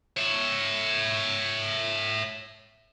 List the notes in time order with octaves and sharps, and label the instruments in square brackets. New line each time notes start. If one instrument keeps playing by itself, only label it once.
[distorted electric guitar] C#5 E5